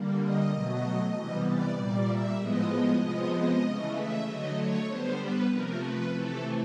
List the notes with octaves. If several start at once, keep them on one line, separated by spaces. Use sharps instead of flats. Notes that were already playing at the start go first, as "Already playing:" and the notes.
Already playing: D3 G3 A#3
D#5
B2 F#3 A3
C3 E3 G3 B3
D5
A#2 G3 A#3 D5
E5
A2 F3 G#3 B3 D#5
C3 F3 G#3 B3 D#5
D#5
C#3 E3 A3
E5
D3 F#3 A3 D#5
C#5
D3 G3 B3 C5
B4
C3 F3 A3 A#4
B4
C3 E3 A3 A4